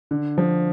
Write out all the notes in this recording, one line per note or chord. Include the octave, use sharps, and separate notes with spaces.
D3
F3